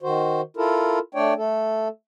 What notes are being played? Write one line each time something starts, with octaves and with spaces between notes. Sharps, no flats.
D#3 F#4 C5
E4 F4 A4 A#4
A3 D4 C#5 D5 G5
A3 A4